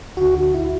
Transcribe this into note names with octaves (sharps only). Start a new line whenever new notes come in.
D2 D3 F#4
F#4
E4